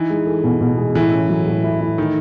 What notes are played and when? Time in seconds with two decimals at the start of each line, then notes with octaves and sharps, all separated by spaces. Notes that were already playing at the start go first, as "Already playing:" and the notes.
Already playing: E3 D#4
0.10 G#3
0.27 A4
0.44 B2
0.61 B2
0.78 G#3
0.95 A2 E3
1.12 C#4
1.29 F#3
1.46 A2
1.64 E4
1.81 E4
1.98 D#3 A3